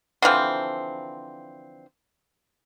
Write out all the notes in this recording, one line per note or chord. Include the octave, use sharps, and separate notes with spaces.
D3 E3 F3 C4